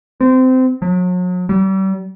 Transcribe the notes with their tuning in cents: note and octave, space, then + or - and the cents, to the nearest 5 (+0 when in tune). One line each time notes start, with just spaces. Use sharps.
C4 -20
F#3 -40
G3 -35